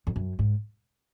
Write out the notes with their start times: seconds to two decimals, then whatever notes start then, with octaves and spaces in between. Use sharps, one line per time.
0.07 F2
0.16 F#2
0.39 G#2